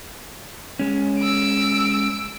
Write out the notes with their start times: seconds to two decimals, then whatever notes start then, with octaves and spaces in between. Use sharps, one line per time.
0.79 G#3 C#4
1.19 E6 D7